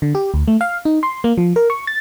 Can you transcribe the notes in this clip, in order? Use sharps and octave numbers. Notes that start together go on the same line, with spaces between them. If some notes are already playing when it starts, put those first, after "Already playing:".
D3
G4
D2
A3
F5
D#4
C6
A#3
F3
A#4
C#6
A6